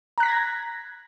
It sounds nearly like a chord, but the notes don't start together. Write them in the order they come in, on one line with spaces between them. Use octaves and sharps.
A#5 F#6 B6 A#6 G#6